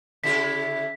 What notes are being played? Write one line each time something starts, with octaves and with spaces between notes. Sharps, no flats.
C#3 E4 G4 B6